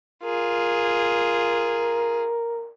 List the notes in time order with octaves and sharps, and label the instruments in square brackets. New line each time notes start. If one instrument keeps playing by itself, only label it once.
[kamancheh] F4 G#4 [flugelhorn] A#4